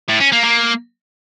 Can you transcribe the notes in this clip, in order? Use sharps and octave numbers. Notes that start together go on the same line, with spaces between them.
A2
C#4
A#3
A#3